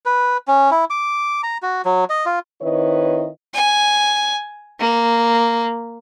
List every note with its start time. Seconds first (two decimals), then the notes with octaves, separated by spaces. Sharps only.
0.06 B4
0.48 C#4
0.71 E4
0.90 D6
1.43 A#5
1.63 F#4
1.85 F#3
2.10 D#5
2.26 F4
2.61 D#3 C4 E4 B4 C#5 D#5
3.54 G#5
4.80 A#3